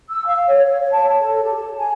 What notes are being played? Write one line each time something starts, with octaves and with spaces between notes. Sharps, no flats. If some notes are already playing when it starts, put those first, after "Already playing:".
E6
F5
C#5
C#5
C#5
A5
C#5
A4
G4
A5
G#5